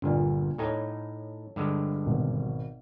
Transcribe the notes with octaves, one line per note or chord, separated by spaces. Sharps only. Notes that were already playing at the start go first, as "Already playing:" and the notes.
G1 G2 A#2 D4
A2 D#4 A4 C#5 G#5
G2 D3 G#3
G#1 B2